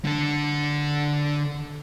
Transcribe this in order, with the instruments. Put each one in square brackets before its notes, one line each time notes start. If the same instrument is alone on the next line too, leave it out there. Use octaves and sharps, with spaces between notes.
[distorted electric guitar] D3 A4